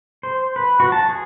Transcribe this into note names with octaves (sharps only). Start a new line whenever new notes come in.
C5
B4
F#4
A5
G#4